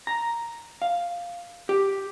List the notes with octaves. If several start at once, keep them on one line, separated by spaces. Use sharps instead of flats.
A#5
F5
G4